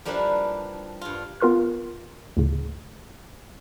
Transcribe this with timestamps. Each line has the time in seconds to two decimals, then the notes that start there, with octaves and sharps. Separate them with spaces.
0.05 F3 G3 A#3 D4 E4 B4
1.01 G2 F4
1.40 B3 F4 A#4 C6 F6
2.37 D2 A2 C#3